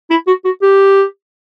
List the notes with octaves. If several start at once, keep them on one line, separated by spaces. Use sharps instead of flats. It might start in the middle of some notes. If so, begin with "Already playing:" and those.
E4
F#4
F#4
G4